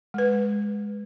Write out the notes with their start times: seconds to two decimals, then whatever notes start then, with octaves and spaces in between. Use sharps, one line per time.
0.14 G#3 B4